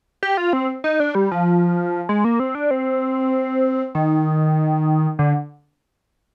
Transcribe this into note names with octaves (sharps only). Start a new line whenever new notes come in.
G4
F4
C4
D#4
D4
G3
F3
G#3
A#3
C4
D4
C4
D#3
D3